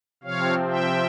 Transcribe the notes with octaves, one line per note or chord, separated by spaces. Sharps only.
C3 F3 C4 C#5 F5
E5 G5